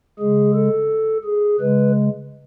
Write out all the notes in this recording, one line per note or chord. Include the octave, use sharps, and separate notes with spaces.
C#3 G#3 G#4
A4
G#4
C#3 G#3 B4